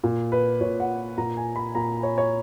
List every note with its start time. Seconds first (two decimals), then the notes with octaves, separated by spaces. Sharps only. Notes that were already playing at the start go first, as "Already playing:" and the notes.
0.04 A#2
0.32 B4
0.61 A#2 C#5
0.80 F#5
1.18 A#2 A#5
1.37 G#5
1.56 B5
1.75 A#2 A#5
2.03 C#5
2.18 C#5